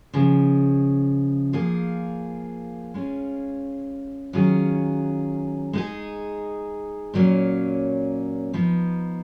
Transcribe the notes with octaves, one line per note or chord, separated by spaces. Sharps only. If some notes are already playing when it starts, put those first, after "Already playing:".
C#3 F3 G#3
F3 A#3 F4 G#4
G#3 C#4 F4
D#3 F#3 C#4 F4 G#4
G#3 D#4 G#4
A#2 F#3 A#3 C#4
F3 B3 D#4